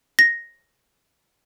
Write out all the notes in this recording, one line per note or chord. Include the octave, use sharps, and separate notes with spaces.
A#6